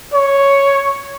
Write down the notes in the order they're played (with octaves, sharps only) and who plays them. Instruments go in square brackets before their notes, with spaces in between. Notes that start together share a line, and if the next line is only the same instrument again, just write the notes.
[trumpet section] C#5